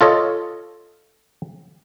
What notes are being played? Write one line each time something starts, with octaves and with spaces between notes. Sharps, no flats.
F4 A4 C#5 D#5